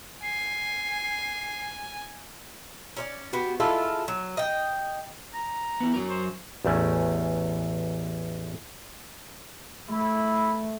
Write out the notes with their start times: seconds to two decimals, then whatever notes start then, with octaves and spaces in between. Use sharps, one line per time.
0.23 G#5 C7
2.97 C#4 C#5 D5
3.33 B3 F#4 G4
3.60 G#3 E4 F4 A4
4.08 F#3
4.37 D#5 G5
5.34 A#5
5.80 B3 E4
5.94 F#2 F#3 A#4
6.09 C5
6.65 A1 E2 A3 C#4
9.89 A3 E4